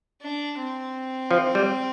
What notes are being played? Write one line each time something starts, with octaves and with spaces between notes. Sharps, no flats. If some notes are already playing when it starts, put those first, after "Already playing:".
D4
C4
F3
G3